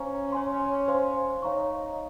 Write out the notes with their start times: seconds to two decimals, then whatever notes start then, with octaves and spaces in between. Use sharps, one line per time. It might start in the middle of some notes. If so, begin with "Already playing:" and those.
Already playing: C#4 C5 F5 A#5 C#6
0.32 C#5 G#5 C6
0.88 C5 F5 C6
1.42 D#4 C#5 F5 A#5 C#6